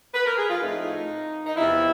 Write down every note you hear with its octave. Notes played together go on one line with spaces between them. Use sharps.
B4
A#4
G#4
F4
A2 F3 A3 C4 D#4
D#4
E2 C3 F3 E4